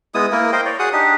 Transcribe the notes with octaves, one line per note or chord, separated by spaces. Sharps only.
G#3 B3 E4 D#6
A#3 E4 A#4
A#4 C5 D#5 G5
C#5 D5
F#4 G#4 F#5 D#6
D4 D#4 G4